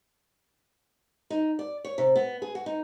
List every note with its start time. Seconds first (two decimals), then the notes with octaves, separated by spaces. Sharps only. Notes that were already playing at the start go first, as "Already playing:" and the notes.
1.30 D#4
1.59 D5
1.85 C#5
1.98 C3
2.16 B3
2.42 G#4
2.55 F#4
2.66 D#4